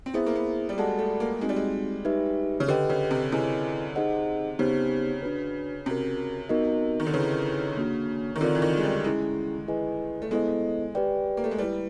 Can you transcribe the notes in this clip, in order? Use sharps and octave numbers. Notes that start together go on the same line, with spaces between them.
C4
B3 E4 G#4 C5 E5
A#3
B3
G3
G#3 F#4 A4 D5 F#5 A5
A3
A#3
G#3 C4 D#4 F#4
G3
G#3
D#4 G4 B4 E5
C#3
D3 G4 B4 D#5 G5
C#3
C3
C3 E4 G#4 B4 D#5 G#5
D#4 G#4 C5 D#5 F#5
C#3 B3 D#4 G4 C5
D4 F#4 B4
C3 C#4 F#4 A#4
B3 D#4 F#4 A#4 D#5
D#3
D3
C#3 E4 G#4 B4
A#3 D4 F#4
D#3
D3 C4 F4 A#4 D5
E3
D#3
G#3
G3
G#3 C#4 E4 G#4
E4 G#4 B4 D#5 G#5
A3
G#3 B3 E4 A4 C5 D#5
G4 B4 D5 G5
A#3
A3
G#3
G3 E4 G4 B4